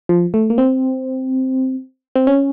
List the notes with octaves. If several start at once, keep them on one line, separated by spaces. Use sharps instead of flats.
F3
A3
A#3
C4
C4
C#4